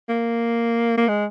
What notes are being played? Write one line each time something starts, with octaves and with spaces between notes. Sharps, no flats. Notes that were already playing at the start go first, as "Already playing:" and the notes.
A#3
A#3
G#3